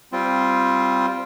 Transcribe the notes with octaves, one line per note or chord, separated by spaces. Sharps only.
G3 C4 F4